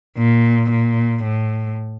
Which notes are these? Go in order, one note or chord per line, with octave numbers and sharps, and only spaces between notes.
A#2
A#2
A2